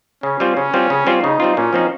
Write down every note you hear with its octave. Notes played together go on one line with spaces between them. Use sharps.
C#3 C#4
G3 C4 F4
C#3 C#4
G3 C4 F4
C#3
G3 C4 F4
C#3 D#4
G3 C4 F4
A#2 C#4
F3 C4 D#4